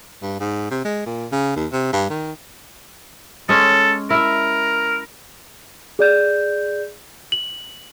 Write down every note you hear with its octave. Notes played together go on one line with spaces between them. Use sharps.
G2
G#2
C3
G#3
A#2
C#3
D#2
C3
G2
D#3
G#3 C#4 A4
E4 A#4 E5
G#4 D5 G6
F#7